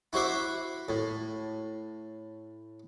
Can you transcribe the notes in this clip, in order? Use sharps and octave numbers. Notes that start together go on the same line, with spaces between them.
E4 F#4 C5 E5 D6
A2